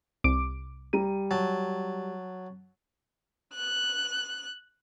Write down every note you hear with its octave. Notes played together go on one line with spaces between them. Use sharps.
C2 D6 D7
G3 A#5 D#7
F#3 A5
F#6